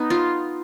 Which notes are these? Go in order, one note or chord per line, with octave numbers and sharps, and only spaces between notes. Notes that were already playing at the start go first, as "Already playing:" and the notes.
Already playing: B3 D#4
F4